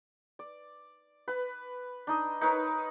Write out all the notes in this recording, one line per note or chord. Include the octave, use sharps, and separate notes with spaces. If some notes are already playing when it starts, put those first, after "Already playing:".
D5
B4 B5
D4 D#4 D#5
D#4 A#4 B4 C#5